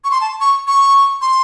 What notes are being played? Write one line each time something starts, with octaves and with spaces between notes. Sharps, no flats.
C#6
C6
A5
C#6
C#6
C6